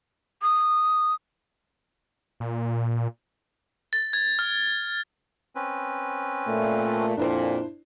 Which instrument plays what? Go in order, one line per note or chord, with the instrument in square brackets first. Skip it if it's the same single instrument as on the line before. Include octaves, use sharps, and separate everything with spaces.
[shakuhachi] D#6
[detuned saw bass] A#2
[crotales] A6
G#6
F6
[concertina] C4 C#4 B4
[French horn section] A#2 A3
[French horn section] F2 A#2 [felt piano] D4 E4 C5